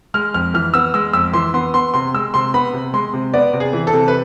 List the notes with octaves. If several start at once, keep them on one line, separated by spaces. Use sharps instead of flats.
G#3 F6
F2 F6
E3 F6
B3 E6
G#3 E6
F2 E6
E3 C6
B3 C6
B3 C6
C3 C6
G#3 E6
C3 C6
B3 B5
C3
G#3 C6
C3
B3 D5
C3
G#4
E3
A4
C3
B4